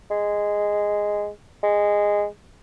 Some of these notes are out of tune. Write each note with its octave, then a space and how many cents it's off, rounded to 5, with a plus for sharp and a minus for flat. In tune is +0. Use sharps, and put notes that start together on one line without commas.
G#3 -5
G#3 -10